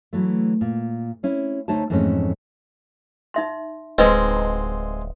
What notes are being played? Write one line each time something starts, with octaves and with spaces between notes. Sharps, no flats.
E3 F#3 A3
A#2
C4 C#4 E4
D2 A3 D#4 C5 C#5 A5
F2 G#2 E3 A3 C4 C#4
D#4 E5 C6
D1 G#3 C4 D#4 B4 D#5